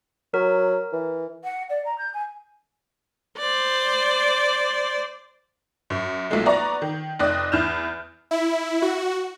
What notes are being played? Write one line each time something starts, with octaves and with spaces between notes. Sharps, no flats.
F#3 A#4
E3
F#5
D5
A#5
G6
G#5
C5 D5
F#2
B1 A#2 F3 F#3 G#3 A3
B3 D5 A#5 C#6 A#6
D#3
F1 C4 D#4 D5 F#6
E2 E4 F6 G6 E7
E4
F#4